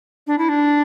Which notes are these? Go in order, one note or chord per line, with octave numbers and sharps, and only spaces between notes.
D4
E4
D4